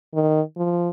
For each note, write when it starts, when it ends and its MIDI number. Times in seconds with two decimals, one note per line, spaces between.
0.14 0.41 51
0.57 0.90 53